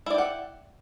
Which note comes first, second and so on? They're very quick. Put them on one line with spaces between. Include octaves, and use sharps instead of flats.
E4 D5 G5 F#5